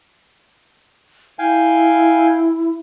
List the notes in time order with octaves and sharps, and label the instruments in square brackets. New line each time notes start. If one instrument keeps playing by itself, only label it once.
[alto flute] E4 [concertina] F5 G5 G#5